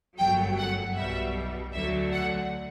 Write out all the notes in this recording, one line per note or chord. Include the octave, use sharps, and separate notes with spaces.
G1 F#2 F#3 A3 G5
F#5
B1 B2 G3 E5
D2 D3 F#3 A3 E5
F#5